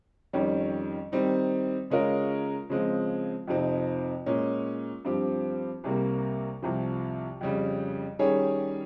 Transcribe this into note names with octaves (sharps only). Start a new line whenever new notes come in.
F2 D#3 G3 C#4
D#3 G3 C4 D#4
C#3 G#3 C#4 F4 A#4
C#3 F3 G#3 C4
F2 C3 F3 C4 D#4
A#2 G#3 C#4
G2 F3 C4 G4
C2 C3 G3 A#3
C2 C3 F3
F2 C#3 G3
D#3 G3 C#4 G#4 C#5